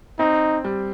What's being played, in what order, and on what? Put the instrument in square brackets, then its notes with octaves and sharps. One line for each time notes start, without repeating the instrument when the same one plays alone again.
[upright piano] C4 [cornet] D#4
[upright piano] G3